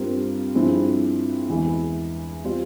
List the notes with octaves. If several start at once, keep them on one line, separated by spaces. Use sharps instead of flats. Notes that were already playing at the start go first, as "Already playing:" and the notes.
Already playing: G2 G3 C4 F4 A#4
G2 F3 C4 E4 G#4
E2 E3 G#3 E4 G#4
G3 C4 F4